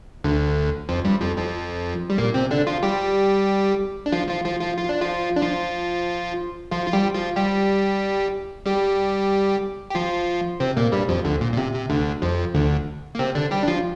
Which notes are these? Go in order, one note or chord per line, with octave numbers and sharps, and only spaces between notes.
D2 D3
F2 F3
G2 G3
F2 F3
F2 F3
G3
A#2 A#3
C3 C4
D3 D4
F3 F4
G3 G4
D4
F3 F4
F3 F4
F3 F4
F3 F4
F4
D4
F3 F4
D4
F3 F4
F3 F4
F4
G3 G4
F3 F4
G3 G4
G3 G4
G4
F3 F4
C3 C4
A#2 A#3
G2 G3
F2 F3
D2 D3
A#2
A#2
C3
C3
D2 D3
F2 F3
D2 D3
A#3
C3 C4
D3 D4
G3 G4
D4
F3 F4